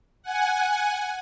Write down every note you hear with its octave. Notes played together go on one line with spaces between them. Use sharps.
F#5 G#5